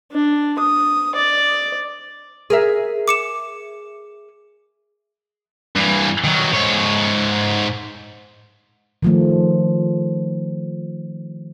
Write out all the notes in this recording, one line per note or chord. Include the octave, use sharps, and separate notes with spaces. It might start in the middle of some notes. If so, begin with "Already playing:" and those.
D4
D#6
D5
G#4 A#4 E5
D6 C#7 E7
G2 E3
D#3 F#3
G#2 C#5
D#3 F3 A3